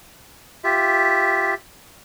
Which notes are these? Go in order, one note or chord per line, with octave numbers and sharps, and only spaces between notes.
F4 G4 E5